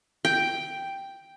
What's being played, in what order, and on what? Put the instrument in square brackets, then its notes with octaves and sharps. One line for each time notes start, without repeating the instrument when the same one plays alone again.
[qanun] G5